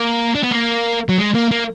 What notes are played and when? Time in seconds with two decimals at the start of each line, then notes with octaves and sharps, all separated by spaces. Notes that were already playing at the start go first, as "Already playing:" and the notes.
Already playing: A#3
0.35 D4
0.44 B3
0.51 A#3
1.09 F#3
1.18 G#3
1.35 A#3
1.51 A#3